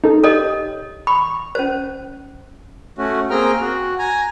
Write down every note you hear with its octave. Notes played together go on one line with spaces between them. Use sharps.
D#4 A4
G4 A4 C#5 D#5
B5 C#6
C#4 C5
A3 C#4 F#4
A#3 C4 G#4 G5 A#5 F6
F#4
G#5 A#5